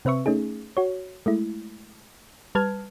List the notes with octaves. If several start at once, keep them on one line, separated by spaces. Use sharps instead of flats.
C3 C4 B4 E5 C#6
A3 C#4 D#4 G#4
F#4 C#5
G#3 A3 E4
G3 B4 A5 F6 G#6